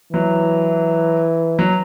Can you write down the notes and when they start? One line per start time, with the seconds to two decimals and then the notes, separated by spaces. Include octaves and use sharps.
0.13 E3 F#3
1.59 F#3